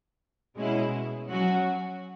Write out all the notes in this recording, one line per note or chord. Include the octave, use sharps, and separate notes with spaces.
B2 G#3 C#4 E4
F#3 C#4 F#4